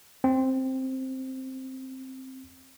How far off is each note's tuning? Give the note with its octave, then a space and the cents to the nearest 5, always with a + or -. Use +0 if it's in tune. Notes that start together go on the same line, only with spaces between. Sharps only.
C4 +5